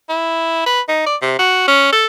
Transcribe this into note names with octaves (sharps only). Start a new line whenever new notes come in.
E4
B4
D#4
D5
C3
F#4
C#4
A4